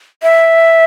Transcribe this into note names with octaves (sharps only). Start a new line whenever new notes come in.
E5